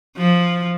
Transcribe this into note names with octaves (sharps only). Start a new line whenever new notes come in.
F3